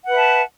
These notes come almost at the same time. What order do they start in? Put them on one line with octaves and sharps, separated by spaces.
F#5 B4 E5 A5